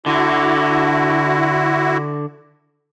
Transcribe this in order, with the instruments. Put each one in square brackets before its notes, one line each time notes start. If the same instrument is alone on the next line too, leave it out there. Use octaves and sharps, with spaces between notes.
[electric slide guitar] D3 [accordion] E4 F#4